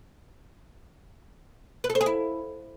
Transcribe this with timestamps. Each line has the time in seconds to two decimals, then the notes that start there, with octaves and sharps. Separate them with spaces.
1.84 B4
1.90 A4
1.95 C5
2.01 G#4
2.06 E4